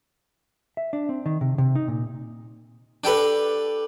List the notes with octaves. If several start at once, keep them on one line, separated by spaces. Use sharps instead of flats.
E5
D4
C4
D#3
C3
C3
D#4
A#2
D4 G4 A4 B4